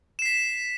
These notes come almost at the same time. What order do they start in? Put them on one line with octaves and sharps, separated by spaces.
E7 C7 B6